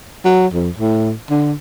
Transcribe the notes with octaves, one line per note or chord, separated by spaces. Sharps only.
F#3
F2
A2
D3